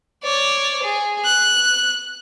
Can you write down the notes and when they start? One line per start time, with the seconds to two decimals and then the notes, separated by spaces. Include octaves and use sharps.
0.23 C#5 D5
0.83 G#4
1.25 F#6